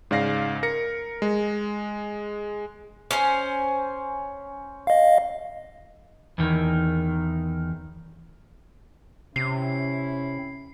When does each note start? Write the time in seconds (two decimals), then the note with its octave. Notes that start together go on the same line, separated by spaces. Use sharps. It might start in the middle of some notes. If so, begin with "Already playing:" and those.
0.11 G#2 C#3 D5 F5 A#6 C7
0.63 A#4 A#6 C#7
1.22 G#3
3.11 C#4 C5
4.87 D#5 F5
6.38 E2 D#3
9.36 C3 C#4 E4 C7